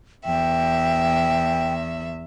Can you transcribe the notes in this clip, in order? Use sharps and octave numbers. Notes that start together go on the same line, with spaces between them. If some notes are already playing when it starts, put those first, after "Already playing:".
E2 E5 G5